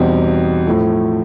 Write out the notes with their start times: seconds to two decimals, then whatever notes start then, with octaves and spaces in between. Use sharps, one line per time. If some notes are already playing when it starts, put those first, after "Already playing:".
Already playing: E2 B2 G3 C4 D#4
0.67 A2 F3 A3